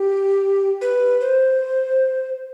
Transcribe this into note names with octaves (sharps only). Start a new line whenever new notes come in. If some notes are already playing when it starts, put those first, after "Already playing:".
Already playing: G4
B4
C5